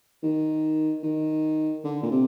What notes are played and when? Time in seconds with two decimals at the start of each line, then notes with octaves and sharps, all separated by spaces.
0.23 D#3
1.03 D#3
1.84 D3
2.02 A#2
2.11 C3